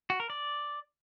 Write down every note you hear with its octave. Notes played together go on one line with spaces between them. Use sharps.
F#4
A#4
D5